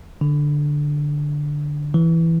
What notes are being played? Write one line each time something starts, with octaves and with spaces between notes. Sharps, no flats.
D3
E3